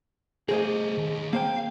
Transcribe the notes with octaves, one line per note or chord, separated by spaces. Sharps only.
A3 G#4 A#4 C5 D#5
D#2
A#3 C5 F5 G5